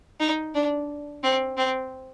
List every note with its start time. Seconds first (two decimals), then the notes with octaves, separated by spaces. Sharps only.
0.20 D#4
0.55 D4
1.24 C4
1.58 C4